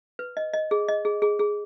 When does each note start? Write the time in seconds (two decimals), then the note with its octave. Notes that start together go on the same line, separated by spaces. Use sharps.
0.19 B4
0.37 D#5
0.54 D#5
0.71 G#4
0.88 D#5
1.05 G#4
1.22 G#4
1.39 G#4